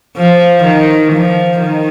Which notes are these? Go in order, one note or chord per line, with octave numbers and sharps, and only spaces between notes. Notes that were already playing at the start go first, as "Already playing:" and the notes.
F3
D#3
F3
D#3